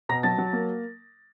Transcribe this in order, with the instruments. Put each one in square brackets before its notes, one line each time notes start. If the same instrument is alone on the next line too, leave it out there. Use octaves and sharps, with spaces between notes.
[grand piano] B2 A#5 A#6
F#3 A5 A6
F#3
A#3